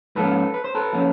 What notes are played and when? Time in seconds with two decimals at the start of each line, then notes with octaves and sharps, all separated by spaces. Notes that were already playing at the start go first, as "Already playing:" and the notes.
0.15 G#2 F3 A#3 C#4 A4 B4
0.54 B4
0.64 C5
0.75 A4 B4
0.93 F3 A#3 C#4